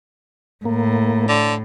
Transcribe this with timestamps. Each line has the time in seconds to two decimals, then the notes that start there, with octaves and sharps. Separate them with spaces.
0.66 A2 A#3
1.29 D3